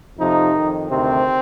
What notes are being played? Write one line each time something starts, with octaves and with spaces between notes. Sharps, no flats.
F2 C3 F3 D#4
F2 D#3
D2 C3 D#3 C4